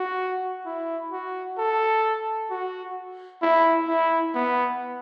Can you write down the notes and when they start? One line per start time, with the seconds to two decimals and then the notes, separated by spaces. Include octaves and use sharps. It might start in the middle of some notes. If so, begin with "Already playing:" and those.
Already playing: F#4
0.66 E4
1.12 F#4
1.58 A4
2.51 F#4
3.42 E4
3.88 E4
4.35 B3